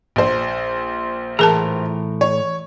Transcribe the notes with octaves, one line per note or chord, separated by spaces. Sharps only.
A#1 C5
A2 E3 G#4 A#4 A5 A#5
C#5